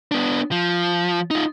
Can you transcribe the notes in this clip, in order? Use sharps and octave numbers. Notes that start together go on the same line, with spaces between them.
B3 D4
F3
D#4 F4